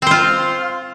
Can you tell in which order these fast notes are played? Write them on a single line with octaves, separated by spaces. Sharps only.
C4 C5 F4